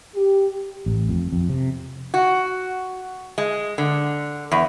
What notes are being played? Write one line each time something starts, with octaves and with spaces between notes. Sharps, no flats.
G4
A1
F2
F2
C3
F#4
G#3
D3
E2